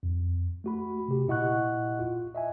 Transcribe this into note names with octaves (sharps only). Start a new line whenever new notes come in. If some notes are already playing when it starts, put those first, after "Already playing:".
F2
A3 F#4 B5
C3 G4
A#2 E4 D#5 F#5 C#6 F#6
F4
D#5 E5 G#5